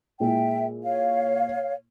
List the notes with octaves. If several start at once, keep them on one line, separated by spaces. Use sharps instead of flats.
A#2 G#3 E4 E5 G5
C#5 F5